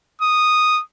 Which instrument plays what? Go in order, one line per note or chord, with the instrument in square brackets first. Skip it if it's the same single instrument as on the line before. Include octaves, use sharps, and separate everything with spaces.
[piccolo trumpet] D#6